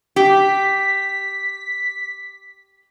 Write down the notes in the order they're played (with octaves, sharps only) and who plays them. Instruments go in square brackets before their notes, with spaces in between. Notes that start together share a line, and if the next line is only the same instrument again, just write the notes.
[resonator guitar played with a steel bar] G4 [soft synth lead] B6